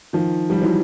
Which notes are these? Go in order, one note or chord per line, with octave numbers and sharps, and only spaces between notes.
D#3 F3
F3 G3
E3 F#3